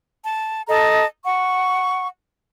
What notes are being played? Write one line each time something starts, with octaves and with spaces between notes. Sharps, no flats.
A5
A4 D#5 A5 A#5
F#5 C#6